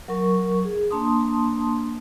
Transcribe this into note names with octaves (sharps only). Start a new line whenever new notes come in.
F#3 A#4 C#6
G#4
A#3 D4 A5 C6 D#6